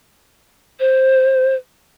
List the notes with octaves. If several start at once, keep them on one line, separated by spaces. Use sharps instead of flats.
C5